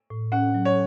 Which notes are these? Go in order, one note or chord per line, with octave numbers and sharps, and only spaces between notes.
A2
C#4 F#5
F#3
C#5